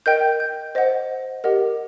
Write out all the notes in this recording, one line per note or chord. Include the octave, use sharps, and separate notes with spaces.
A#4 D#5 G5 G6
G6
C5 D#5 F#5
G4 A#4 D#5 F#5